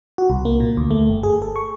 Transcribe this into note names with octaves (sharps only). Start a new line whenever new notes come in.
F#4
C2
A#3
A#2
D2
A3
G1
G#4
A4
C#6